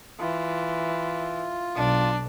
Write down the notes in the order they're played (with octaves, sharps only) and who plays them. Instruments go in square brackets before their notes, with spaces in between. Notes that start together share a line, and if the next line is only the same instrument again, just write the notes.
[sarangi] E3 [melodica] F4
[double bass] B1 [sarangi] D4